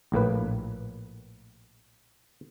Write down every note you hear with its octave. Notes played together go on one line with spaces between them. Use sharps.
A#1 A2 A#3 B4